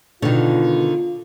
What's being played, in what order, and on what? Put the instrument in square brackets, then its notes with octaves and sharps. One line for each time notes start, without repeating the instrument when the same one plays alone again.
[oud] B2 [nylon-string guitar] D3 D#3 [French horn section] F4